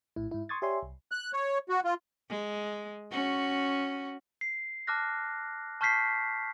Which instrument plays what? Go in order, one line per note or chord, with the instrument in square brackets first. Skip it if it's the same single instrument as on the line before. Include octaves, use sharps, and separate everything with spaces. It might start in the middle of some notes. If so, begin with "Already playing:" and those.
[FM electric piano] A#1 A2 E4
G#2 E4
C6 C#6 D#6 G#6 A6
G4 C#5 D5 E5 G#5 C6
C2
[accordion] F#6
C#5
F#4
F4
[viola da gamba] G#3
C#4 F#4
[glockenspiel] C7
A5 D6 F6 F#6 A#6
A5 C#6 F6 G6 B6 C7